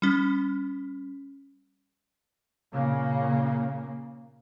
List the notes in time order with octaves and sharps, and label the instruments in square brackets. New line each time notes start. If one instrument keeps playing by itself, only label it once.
[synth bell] G3 C#4
[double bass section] A#2 C#3 A#3